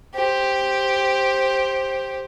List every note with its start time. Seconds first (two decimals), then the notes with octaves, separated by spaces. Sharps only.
0.15 G4 C5